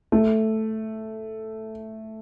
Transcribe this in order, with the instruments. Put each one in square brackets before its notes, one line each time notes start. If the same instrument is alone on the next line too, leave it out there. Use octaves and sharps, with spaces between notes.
[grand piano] A3